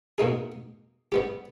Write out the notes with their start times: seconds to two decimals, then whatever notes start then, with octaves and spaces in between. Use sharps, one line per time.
0.18 B2 A#3 D#4 G#4
1.12 G3 B3 G4